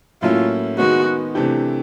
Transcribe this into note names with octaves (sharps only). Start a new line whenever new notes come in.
A2 F#3 A#3 C#4 E4 F4
D#3 G#3 B3 D#4 F#4
C3 E3 A3 D4 G4